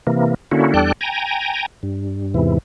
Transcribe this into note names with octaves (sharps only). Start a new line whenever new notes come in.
C3 E3 A#3
D3 A#3 C#4 E4 F#4
E2 G3 D4 A4 G5 F#6
G5 G#5 A#5
G2
E2 G#2 C3 E3